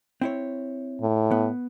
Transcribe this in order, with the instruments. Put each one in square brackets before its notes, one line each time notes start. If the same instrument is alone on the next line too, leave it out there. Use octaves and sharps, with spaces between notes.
[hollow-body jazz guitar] C4 E4 C#5
[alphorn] A2
[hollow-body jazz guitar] B3